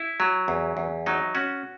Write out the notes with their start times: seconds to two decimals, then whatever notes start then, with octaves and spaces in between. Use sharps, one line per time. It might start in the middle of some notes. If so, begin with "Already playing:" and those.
Already playing: E4
0.20 F#3
0.48 E2
0.77 E2
1.06 F#3 D#4
1.35 C#4 F#4